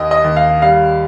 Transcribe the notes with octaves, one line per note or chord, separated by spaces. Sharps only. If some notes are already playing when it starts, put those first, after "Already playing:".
Already playing: D#2 D#3 A#3 D#5
D#5
D#2
F5
G3 F5